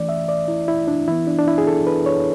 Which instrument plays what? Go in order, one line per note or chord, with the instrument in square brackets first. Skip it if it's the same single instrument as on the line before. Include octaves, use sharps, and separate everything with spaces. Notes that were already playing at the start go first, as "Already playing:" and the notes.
Already playing: [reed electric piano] E3 A3 C#4 D5
E5
D5
E4
E4
D4
E3 B3 E4
D4
D4
E4
G#4
A4
B4
C#5